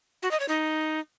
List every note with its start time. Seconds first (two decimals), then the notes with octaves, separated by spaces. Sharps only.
0.22 F#4
0.31 D#5
0.40 C#5
0.48 D#4